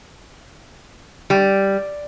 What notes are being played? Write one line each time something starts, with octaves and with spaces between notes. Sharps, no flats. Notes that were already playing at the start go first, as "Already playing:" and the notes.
G3